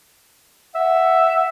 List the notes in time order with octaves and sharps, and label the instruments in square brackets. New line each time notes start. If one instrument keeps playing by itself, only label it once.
[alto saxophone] E5 [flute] F#5